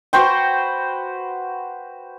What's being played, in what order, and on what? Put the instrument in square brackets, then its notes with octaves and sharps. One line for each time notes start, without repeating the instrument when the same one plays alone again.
[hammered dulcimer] F#4 B4 C5 G5